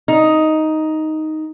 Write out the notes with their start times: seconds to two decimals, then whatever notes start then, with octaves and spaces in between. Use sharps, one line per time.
0.08 D#4